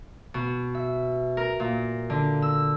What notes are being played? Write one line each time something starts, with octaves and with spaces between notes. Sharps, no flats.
B2
E5
A#4
A#2
D3
E6